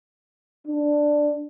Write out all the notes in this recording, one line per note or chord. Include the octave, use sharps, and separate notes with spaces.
D4